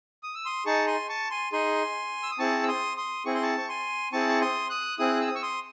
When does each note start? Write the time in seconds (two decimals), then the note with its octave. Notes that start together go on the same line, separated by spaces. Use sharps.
0.23 D#6
0.35 E6
0.46 C6 D#6
0.66 D#4 G#4 A5 C#6
0.87 G#5 C6
1.09 A5 C#6
1.31 G#5 C6
1.52 D#4 G#4 G#5 C6
2.23 E6
2.31 D#6
2.39 C4 E4 G#4 A5 C#6
2.63 E6
2.68 C6 D#6
2.97 C6 D#6
3.25 C4 E4 G#4 C#6
3.35 C6
3.42 A5 C#6
3.58 C#6
3.69 G#5 C6
4.12 C4 E4 G#4 A5 C#6
4.30 C#6
4.41 C6 D#6
4.70 D#6 F#6
4.98 C4 E4 G#4 D#6 F#6
5.21 E6
5.28 D#6
5.35 C#6 E6
5.42 C6 D#6